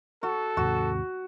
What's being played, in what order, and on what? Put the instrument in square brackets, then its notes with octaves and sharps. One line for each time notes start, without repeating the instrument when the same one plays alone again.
[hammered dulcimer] F#4 [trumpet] A4
[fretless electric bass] D#2 G#2 C3 [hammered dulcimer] F#4